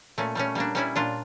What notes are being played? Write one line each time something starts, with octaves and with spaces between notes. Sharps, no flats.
A#2 A3 C#4
G3 A3 C#4
G3 A#3 D4
G3 C#4 E4
A#2 D4 F4